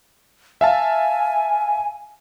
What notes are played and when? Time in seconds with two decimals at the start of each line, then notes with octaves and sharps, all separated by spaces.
0.61 E5 F5 G#5 A5